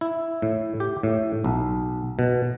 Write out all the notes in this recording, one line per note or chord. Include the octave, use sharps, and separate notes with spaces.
E4
A2
G4
A2
B1
B2